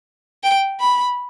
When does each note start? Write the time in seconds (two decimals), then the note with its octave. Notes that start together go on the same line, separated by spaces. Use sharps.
0.43 G5
0.80 B5